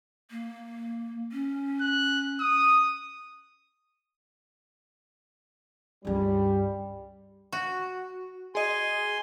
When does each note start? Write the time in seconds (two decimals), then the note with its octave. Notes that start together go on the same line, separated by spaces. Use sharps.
0.31 A#3
1.32 C#4
1.81 F#6
2.40 D#6
6.05 C#2 G2 G3
7.52 F#4
8.55 G#4 D#5 G#5 C6